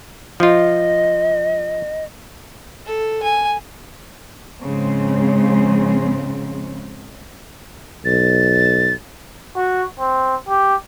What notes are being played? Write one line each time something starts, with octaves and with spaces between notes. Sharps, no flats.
F3 F4 D#5
A4
G#5
G#2 C#3 F3 G#3 C4
B1 A6
F#4
C4
G4